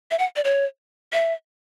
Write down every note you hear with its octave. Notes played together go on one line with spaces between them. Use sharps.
E5
F#5
D5
C#5
E5